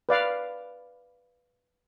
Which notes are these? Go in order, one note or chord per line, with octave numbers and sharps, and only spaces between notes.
B4 D5 F5